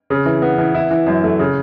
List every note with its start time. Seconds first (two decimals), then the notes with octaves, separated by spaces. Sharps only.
0.10 C#3
0.26 E3
0.42 B3
0.58 E3
0.74 E4
0.91 E3
1.06 F#2
1.24 A3
1.39 C#3